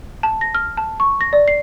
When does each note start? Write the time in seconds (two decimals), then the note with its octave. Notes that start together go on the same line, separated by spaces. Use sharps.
0.23 A5
0.41 A#6
0.55 F6
0.77 A5
1.00 C#6
1.21 A#6
1.33 D5
1.48 C7